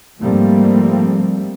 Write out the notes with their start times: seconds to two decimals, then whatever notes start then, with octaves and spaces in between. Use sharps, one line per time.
0.20 G#2 F3 G3 A3 A#3 C4